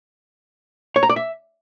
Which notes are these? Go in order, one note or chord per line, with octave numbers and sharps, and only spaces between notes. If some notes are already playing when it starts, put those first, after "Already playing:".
C#5
A#5
D5
E5